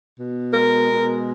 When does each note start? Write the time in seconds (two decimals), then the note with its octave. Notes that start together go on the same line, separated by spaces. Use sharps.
0.17 B2
0.53 G#3 A#4
0.90 B2